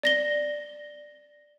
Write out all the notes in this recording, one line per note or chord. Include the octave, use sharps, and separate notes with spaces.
D5 A#6 G7